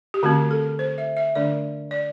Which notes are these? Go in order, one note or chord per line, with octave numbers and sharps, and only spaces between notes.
G4
D3 A3 C4 F#4
A4
C5
E5
E5
D3 A3 D4 D5
D5